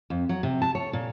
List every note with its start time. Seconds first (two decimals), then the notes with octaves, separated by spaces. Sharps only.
0.10 F2
0.29 F#3
0.43 C3
0.62 A5
0.75 C#5
0.93 A#2